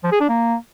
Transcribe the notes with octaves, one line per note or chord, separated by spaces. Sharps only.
F3
G#4
D4
A#3